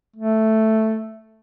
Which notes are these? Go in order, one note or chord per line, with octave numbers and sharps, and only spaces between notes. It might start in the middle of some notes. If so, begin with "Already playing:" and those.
A3